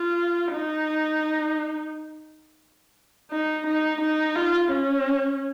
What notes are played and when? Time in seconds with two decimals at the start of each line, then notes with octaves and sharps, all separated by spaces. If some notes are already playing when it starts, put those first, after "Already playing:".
Already playing: F4
0.52 D#4
3.31 D#4
3.67 D#4
4.01 D#4
4.36 F4
4.71 C#4